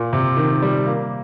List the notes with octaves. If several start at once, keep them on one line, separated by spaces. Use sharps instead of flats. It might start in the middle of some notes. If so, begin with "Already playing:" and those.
Already playing: A#2
C3
D#3
G3
A#3